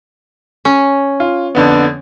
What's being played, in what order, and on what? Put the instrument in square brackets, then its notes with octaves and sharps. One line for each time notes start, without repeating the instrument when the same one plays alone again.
[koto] C#4
[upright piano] F4
F2 D3 B3